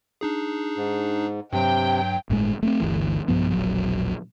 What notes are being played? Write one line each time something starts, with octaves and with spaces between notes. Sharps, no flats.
D4 D#4 G#4
G#2
G2 C3 F#3 G5
G1 A2 C3 G#3
A3 B3 C4
G1 D2 E3
B1 G2 F3 B3
E1 A#1 F#3